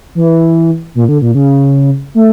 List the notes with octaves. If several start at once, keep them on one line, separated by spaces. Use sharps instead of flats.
E3
A#2
D3
A#2
C#3
A3